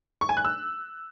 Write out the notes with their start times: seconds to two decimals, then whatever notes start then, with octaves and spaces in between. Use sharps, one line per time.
0.21 C#6
0.29 G#5
0.37 F#6
0.45 E6